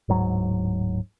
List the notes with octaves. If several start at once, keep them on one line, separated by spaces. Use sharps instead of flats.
D1 G#2 F#3